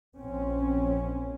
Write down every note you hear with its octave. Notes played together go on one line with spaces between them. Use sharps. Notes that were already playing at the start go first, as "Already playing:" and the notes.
A#1 C4 C#4